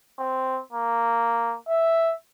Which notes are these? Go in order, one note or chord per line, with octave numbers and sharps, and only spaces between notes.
C4
A#3
E5